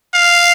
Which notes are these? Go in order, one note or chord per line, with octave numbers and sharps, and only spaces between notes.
F5